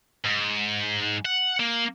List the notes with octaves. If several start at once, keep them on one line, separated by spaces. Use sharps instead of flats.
G#2
F#5
A#3